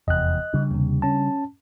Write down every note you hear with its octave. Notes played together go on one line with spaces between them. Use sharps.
F1 E2 D#5 F#6
C#3 G3 D4
D#2 C3
C#4 A5